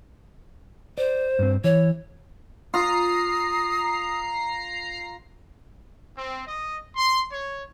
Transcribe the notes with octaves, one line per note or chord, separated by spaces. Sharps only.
C5 D5
G2 C4
E3 C#5
F4 A#5 D#6 C7
C4
D#5
C6
C#5